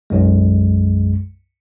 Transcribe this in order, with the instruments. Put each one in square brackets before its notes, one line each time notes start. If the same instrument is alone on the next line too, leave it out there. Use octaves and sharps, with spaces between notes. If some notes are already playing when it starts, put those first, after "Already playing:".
[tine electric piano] B1 F#2 G#3